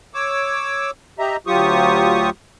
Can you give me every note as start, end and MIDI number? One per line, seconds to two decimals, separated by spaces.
0.14 0.91 73
0.14 0.91 86
0.14 0.91 88
1.19 1.37 67
1.19 1.37 75
1.19 1.37 76
1.19 1.37 82
1.47 2.30 38
1.47 2.30 54
1.47 2.30 65
1.47 2.30 67
1.47 2.30 85
1.47 2.30 87